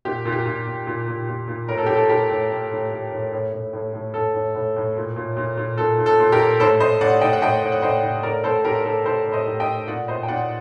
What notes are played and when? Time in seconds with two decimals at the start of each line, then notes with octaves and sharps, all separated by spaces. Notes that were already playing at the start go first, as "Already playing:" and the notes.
0.05 A#2 G4
0.25 A#2
0.32 G4
0.46 A#2
0.67 A#2
0.87 A#2
1.08 A#2
1.28 A#2
1.48 A#2
1.68 A2 A#4
1.78 A4
1.86 A2 G4
1.96 A4
2.09 A2 G4 A#4
2.31 A2
2.50 A2
2.71 A2
2.91 A2
3.12 A2
3.32 A2
3.53 A2
3.73 A2
3.93 A2
4.14 A2 A4
4.34 A2
4.55 A2
4.76 A2
4.97 A#2
5.16 A#2
5.37 A#2
5.57 A#2
5.78 A#2 A4
5.99 A#2
6.06 A4
6.19 A#2
6.32 G4 A#4
6.39 A#2
6.60 A2 A4 C5
6.80 A2 C5 D#5
7.01 A2 D5 F#5
7.21 A2 D#5 G5
7.33 F#5
7.42 A2 D#5 G5
7.62 A2
7.72 F#5
7.82 A2 C5 D#5
8.03 A2
8.23 A2 A#4 D5
8.44 A2 A4 C5
8.64 A2 G4 A#4
8.80 A#4
8.85 A2 A4
9.05 A2 A4 C5
9.26 A2
9.32 C5 D#5
9.46 A2
9.60 D#5 G5
9.67 A2
9.87 A#2 D5 F#5
10.08 A#2 C5 D#5
10.23 G5
10.28 A#2 D5 F#5